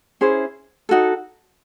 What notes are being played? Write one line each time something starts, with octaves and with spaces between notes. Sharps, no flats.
C#4 E4 G#4 C5
D#4 F#4 A4